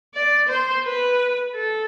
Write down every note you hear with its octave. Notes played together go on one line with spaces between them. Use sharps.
D5
C5
B4
A4